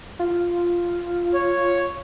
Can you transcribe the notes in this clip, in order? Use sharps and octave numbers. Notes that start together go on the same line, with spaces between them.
F4
C#5